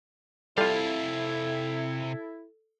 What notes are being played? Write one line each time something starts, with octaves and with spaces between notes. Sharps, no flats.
C3 G3 E4 F4 A4 F5